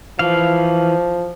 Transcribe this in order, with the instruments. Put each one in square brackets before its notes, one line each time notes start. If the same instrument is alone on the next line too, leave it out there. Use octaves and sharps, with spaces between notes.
[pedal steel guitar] E3 F5 [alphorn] F3